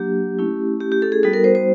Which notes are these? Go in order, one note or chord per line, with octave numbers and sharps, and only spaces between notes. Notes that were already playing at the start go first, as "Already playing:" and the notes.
Already playing: F#3 A#3 D4 G4
A3 C#4 E4
G4
G4
A4
G#4
G3 B3 D#4 F#4 A4
A#4
C5
C5